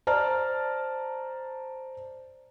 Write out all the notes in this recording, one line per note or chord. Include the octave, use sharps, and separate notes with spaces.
C5 D5 A5 A#5 F6